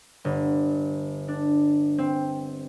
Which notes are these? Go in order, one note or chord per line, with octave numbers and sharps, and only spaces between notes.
G1
D4
C4